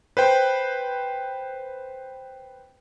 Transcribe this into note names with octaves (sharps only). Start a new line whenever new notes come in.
B4 C5 G5